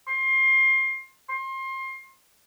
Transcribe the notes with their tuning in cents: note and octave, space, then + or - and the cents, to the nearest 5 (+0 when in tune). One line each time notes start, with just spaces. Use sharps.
C6 +25
C6 +30